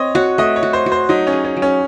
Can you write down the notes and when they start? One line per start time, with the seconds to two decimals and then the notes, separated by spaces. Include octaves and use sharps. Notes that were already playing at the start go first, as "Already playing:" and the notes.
Already playing: C4 C#5 D#5
0.15 F#4 C#5
0.38 A3 D#5
0.56 C#5
0.63 F#4
0.73 C5
0.86 F#4
0.92 C5
1.09 F#3 D#4
1.27 C#4
1.33 G#4
1.45 C#4
1.57 F#3
1.62 C#4